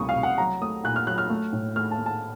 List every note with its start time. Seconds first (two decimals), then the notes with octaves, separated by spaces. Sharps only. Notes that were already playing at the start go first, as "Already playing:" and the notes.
Already playing: C2 A3 C#6 D#6
0.09 F5
0.16 C2
0.23 F#5
0.38 F#3 A#5
0.61 A3 D#6
0.84 A#2 F#6
0.96 F6
1.07 F#3 F#6
1.18 F6
1.30 A3
1.53 A2
1.76 A3 F6
1.91 A5
1.98 A3
2.06 A5